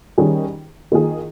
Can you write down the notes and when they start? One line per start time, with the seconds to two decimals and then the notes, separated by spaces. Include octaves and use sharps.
0.18 D#3 G3 C#4 G#4
0.92 D#3 A#3 F4 G#4